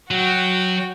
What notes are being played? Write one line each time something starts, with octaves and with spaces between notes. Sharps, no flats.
F#3 F#4 G5